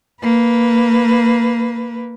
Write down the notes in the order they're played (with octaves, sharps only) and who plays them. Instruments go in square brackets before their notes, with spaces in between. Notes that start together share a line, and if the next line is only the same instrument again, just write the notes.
[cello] A#3 B4